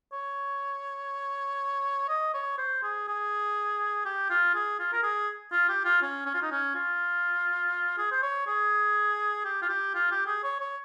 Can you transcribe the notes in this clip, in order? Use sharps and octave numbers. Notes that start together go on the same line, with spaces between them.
C#5
D#5
C#5
C5
G#4
G#4
G4
F4
G#4
F4
A#4
G#4
F4
G4
F4
C#4
C#4
F4
D#4
C#4
F4
G#4
C5
C#5
G#4
G4
F4
G4
F4
G4
G#4
C#5
C#5